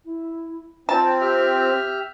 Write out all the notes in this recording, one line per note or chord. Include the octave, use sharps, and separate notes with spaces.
E4
C4 F4 A5
G4 E5 F6